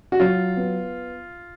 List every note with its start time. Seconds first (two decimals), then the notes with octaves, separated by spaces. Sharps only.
0.12 F#4
0.20 F#3 F4
0.57 B3